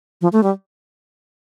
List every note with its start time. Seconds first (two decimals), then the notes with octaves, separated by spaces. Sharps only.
0.21 F3
0.33 A3
0.43 G3